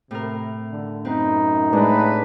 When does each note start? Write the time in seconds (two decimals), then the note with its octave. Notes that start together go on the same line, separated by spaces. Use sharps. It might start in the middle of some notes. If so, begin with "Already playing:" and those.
0.11 A2 C3 A#4
0.72 D3
1.05 F#2 C4 D#4 B4
1.73 A2 G#3 D4 B4